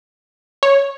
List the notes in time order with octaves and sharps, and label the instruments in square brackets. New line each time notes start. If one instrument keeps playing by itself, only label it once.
[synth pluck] C#5